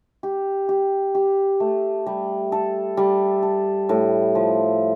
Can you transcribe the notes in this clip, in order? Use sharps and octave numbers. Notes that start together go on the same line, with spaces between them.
G4
G4
G4
A3
G3
A4
G3
A4
A2
F3